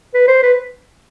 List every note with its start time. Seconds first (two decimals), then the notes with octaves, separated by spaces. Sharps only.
0.14 B4
0.28 C5
0.43 B4